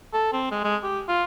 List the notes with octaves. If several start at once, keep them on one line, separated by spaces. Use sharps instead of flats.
A4
C4
G#3
G#3
G4
F4